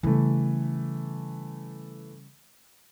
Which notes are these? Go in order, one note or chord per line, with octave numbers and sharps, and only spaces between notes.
C#3 E3 G3 A3